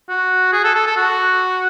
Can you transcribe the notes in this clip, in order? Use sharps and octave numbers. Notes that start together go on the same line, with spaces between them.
F#4
G#4
A4
A4
A4
F#4